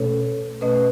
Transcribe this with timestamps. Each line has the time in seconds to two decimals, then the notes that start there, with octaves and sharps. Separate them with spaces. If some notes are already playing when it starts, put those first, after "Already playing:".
Already playing: B2 A3 C#4 A4 C#5
0.61 B2 A3 C#4 B4 D#5